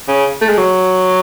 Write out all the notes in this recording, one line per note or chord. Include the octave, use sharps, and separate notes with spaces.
C#3
A3
G#3
F#3